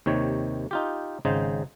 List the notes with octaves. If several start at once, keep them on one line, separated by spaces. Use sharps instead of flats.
D#2 C3 D#3 C#5
D#4 F4 G4
G#1 C#3 D#4 C5